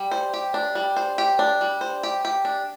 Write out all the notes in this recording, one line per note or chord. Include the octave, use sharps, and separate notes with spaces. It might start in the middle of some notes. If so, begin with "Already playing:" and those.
Already playing: G3
C5
G4
D4
G3
C5
G4
D4
G3
C5
G4
G4
D4